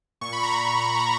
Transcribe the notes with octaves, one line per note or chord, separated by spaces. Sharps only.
A#2 C#6
B5
A#5